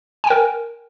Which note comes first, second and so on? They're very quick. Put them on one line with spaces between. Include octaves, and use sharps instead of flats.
G#5 G5 A#4